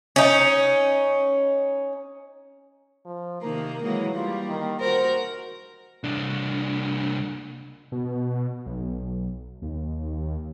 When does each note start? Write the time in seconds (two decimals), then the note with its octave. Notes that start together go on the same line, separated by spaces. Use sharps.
0.16 C#4 D#4
3.05 F3
3.42 C3 D#3 A#3 A#4
3.83 E3 F#3 G#3 A#3
4.15 G3 A#3 F4
4.49 D#3
4.80 F#4 A#4 C5
6.04 C2 D4
7.92 B2
8.66 B1
9.62 D#2